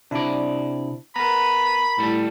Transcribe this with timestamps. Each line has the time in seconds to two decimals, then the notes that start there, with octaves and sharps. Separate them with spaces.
0.11 C3 D4 E4 D5
1.16 B3 A#4 A#5 B5
1.99 A2 G3 A4